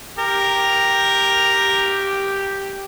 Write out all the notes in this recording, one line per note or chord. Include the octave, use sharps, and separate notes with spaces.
G4 A#4